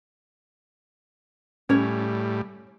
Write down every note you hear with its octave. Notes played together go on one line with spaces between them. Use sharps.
A2 G3 C#4 C#5